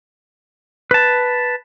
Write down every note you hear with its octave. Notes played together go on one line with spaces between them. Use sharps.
B4 A5